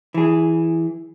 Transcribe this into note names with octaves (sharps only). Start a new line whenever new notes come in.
E3 G#4